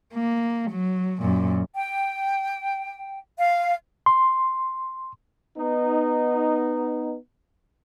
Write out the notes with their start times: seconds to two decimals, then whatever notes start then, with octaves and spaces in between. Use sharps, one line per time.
0.14 A#3
0.71 F#3
1.22 F#2 A#2
1.76 G5
3.38 F5
4.06 C6
5.58 B3 D#4